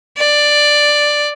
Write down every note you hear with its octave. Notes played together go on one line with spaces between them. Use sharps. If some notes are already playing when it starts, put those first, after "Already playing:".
D5